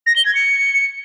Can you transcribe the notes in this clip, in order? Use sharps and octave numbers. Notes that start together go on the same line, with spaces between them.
A#6
G7
G#6
C#7